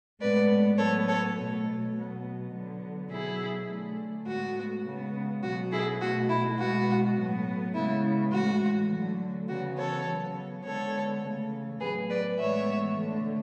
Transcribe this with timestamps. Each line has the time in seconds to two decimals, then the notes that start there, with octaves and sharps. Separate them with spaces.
0.21 A2 G#3 B3 B4 D5
0.78 A2 F#3 B3 A4 C#5
1.08 A4 C#5
1.37 B2 A3
1.94 B2 F#3 B3
2.53 D3 F#3 B3
3.11 B2 F#3 B3 E4 G#4
3.69 D3 A3
4.26 A2 G#3 B3 F#4
4.85 C#3 G#3 B3
5.42 B2 F#3 B3 F#4
5.71 E4 G#4
6.01 B2 A3 F#4
6.29 E4
6.59 B2 G#3 B3 F#4
7.17 A2 F#3 B3
7.74 C#3 G#3 B3 E4
8.32 A2 E3 G#3 F#4
8.90 D3 F#3 A3
9.48 C#3 E3 B3 F#4
9.77 A4 C#5
10.07 C#3 F#3 B3
10.64 D3 G#3 B3 A4 C#5
11.22 C#3 E3 A3
11.80 A2 F#3 B3 G#4 B4
12.09 B4 D5
12.38 A2 E3 G#3 B3 C#5 E5
12.97 D3 A3